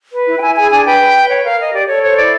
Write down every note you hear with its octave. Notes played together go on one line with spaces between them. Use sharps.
B4
E4
G5
E4 G#5
G#4 G#5
D4 G#5
B4 G5
B4
B4
C#5
A#4 F5
A#4 D#5
G4 D5
A4 C#5
C5 C#5
E4 D5